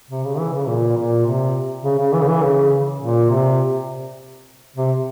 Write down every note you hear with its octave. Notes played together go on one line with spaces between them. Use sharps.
C3
C#3
E3
C#3
A#2
A#2
C3
C#3
C#3
E3
C#3
E3
C#3
A#2
C3
C3